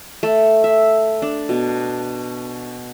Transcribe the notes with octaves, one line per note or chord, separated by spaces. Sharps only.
A3
E5
D4
B2